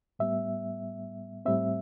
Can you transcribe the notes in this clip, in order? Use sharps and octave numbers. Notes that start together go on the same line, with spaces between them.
A2 G3 B3 E5
A2 G3 C4 E5